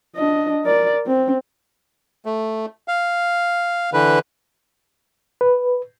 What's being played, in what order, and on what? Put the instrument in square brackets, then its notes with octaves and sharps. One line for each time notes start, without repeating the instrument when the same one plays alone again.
[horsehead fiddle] D4 D#5
A#4 D5
C4
[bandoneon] A3
F5
D3 E3 B4
[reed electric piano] B4